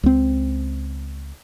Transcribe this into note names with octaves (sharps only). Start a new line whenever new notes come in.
C#2 C4